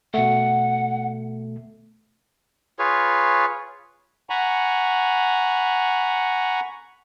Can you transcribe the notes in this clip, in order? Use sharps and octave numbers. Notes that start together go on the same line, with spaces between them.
B2 A3 F#5
F4 G#4 B4 C#5
F#5 G#5 A#5 B5 C#6